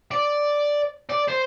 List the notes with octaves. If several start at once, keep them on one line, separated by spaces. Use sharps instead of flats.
D5
D5
C5